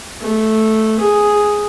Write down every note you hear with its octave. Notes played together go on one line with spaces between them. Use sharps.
A3
G#4